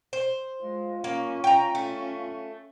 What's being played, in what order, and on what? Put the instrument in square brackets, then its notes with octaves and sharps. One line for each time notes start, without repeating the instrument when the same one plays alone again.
[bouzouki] C5
[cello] G#3 [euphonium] F4
[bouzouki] A#3 [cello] C#4
[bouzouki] G5 A#5
[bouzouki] A3 [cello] C#4